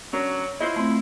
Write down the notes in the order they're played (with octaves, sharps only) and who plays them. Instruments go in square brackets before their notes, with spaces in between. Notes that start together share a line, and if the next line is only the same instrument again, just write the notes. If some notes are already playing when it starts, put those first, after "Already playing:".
[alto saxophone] F#3 [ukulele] C#4 D4 A#4
[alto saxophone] E4 [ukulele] F4 C5 D#5
[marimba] A3 C4